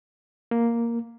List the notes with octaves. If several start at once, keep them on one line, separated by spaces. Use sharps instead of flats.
A#3